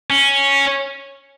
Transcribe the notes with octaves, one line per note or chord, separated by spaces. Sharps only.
C#4